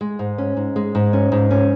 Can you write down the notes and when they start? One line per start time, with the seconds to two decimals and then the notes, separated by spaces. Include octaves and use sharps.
0.01 G#3
0.19 G#2
0.38 C#4
0.57 G#2
0.76 G#3
0.95 G#2
1.13 C#4
1.32 G#2
1.51 C#4